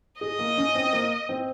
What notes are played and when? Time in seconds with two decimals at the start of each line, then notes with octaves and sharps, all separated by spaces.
0.21 G#4 D#5
0.39 A#3
0.58 C#4
0.75 C4
0.93 A#3
1.29 C4